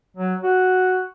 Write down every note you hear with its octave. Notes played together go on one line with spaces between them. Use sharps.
F#3
F#4